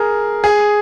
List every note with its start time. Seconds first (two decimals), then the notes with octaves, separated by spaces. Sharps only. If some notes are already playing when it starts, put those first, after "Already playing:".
Already playing: G#4 A#4
0.44 G#4